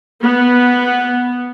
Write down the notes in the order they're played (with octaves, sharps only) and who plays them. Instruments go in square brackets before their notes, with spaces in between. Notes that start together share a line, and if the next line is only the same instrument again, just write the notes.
[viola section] B3